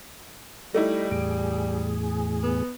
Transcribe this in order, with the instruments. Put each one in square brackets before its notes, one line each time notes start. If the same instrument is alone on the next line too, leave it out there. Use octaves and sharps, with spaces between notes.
[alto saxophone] G3 [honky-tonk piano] A3 D#4 E4
[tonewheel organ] E2 A2 G#4 [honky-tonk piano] D7
[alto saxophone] B3